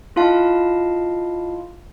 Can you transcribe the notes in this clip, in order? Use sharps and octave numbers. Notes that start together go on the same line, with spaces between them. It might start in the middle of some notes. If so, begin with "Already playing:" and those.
E4 F4 D#5 F5 A5